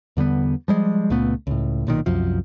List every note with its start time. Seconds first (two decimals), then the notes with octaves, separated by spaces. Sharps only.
0.17 E2 D3 G3 B3
0.68 F3 G3 G#3
1.10 C#2 A#2 A3 B3
1.47 C#2 A2
1.87 B1 A#2 D#3
2.06 C2 F#2 F3